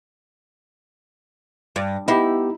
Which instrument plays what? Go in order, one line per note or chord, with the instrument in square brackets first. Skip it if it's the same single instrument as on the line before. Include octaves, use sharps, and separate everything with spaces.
[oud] G2
[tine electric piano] B3 G4 [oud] D#4 E4